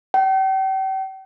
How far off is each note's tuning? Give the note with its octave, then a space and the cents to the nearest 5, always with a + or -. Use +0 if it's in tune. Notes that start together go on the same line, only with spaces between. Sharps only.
G5 -40